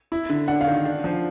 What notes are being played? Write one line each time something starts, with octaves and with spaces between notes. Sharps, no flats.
E4
D3
D4 F#5
F5
D#3
D4
F3